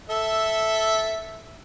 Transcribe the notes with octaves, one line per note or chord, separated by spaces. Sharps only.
A4 E5